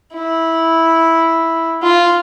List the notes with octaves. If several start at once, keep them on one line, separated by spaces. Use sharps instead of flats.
E4
F4